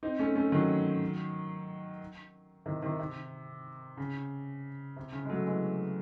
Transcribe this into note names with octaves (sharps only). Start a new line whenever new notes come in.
C4 D#4
A3 C#4
A3 C#4
D#3 F#3
C3 D#3
C3 D#3
C3
C#3
C3
C#3
G#3
F#3 A3
E3 G#3